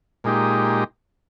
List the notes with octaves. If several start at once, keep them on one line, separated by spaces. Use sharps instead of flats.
A#2 G#3 D#4 G4